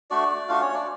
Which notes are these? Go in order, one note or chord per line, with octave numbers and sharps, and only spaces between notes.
A3 D4 F#4 D5
A3 D4 F4 F#4 F5
C#4 C#5
D4 D5